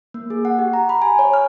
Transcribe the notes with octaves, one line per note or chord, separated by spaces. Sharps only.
A#3
G#4
F#5
G4
A#5
B5
G#5
C#5
F6